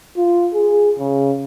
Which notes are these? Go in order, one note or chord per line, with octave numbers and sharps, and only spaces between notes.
F4
G#4
C#3